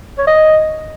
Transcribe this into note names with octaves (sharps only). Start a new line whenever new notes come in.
C#5
D#5